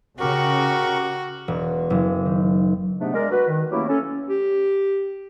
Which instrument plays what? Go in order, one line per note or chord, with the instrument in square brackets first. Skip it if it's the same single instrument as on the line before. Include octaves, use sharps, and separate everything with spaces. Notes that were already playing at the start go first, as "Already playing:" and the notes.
[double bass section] C#3 [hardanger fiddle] F#4 [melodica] G4 A#4 C#6
[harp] E1
F#1
D#3
[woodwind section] G#2 C3 A3 B3 D4
G#3 A#4 D5
F#4 B4
D#3
F#3 A3 A#3 C#4 E4 G4
C#4 A4
[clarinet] G4